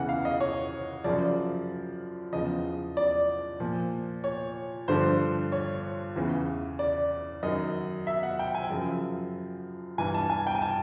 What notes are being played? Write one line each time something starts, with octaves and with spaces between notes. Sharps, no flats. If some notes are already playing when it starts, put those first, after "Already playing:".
Already playing: E2 C#3 E3 F#5
F5
D#5
C#5
F#2 C#3 F3 D5
E2 C#3 F3 D#5
D5
A#2 F3
C#5
G2 D3 F3 C5
C#5
E2 C#3 E3
D5
F#2 D#3 D#5
E5
F#5
G5
G#5
F#2 C#3 F3
G2 E3 G#5
A5
G#5
G5
G#5
A5